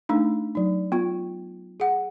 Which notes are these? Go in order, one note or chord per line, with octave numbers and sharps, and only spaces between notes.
A3 D4 D#4
F#3 D#4
B3 F4
G#4 F#5